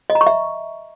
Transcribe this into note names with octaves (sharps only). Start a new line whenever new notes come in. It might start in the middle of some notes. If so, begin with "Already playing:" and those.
D#5
A#5
C#6
E5